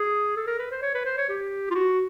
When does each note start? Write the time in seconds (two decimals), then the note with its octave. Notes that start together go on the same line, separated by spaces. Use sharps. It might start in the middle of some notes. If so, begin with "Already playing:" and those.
Already playing: G#4
0.37 A4
0.47 A#4
0.59 B4
0.71 C5
0.82 C#5
0.94 B4
1.05 C5
1.17 C#5
1.29 G4
1.71 F4
1.75 F#4